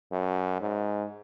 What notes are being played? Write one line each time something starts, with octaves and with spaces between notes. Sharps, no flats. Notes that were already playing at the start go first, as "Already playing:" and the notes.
F#2
G#2